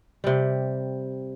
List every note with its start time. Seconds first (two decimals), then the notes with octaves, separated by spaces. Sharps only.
0.24 C3 G3